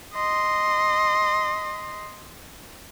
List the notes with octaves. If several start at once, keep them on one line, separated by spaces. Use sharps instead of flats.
D#5 C6